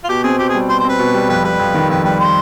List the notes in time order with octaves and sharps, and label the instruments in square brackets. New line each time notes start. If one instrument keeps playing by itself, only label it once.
[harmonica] F4
[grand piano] B2 [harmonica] G4
[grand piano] C4 [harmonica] G#4
[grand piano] B2 [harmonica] G4
[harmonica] G#4
[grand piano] G3
[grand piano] B2 [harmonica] C5
[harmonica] C5
[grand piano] C4 [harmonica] B4
[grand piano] B2
G3
[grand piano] F2 [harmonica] B4
[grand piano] G3 [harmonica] B4
[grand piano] F2
D#3
[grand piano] F2 [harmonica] B4
[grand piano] G3 [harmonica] B4
[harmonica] C5